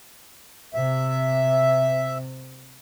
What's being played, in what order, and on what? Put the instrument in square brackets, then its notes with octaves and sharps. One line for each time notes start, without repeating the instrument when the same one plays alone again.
[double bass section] C3 [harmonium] E5